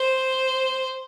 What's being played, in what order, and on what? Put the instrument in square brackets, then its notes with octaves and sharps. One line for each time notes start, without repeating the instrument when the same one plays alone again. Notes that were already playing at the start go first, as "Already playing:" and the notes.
Already playing: [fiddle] C5